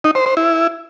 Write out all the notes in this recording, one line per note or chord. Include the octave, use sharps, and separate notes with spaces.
D#4
C5
C5
E4